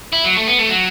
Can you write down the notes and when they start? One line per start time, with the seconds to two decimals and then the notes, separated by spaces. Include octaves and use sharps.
0.13 E4
0.24 F#3
0.36 A3
0.47 B3
0.58 A3
0.69 F#3